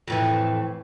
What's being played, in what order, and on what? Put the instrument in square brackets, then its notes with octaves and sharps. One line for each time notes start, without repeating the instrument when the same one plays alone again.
[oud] F2 A2 E3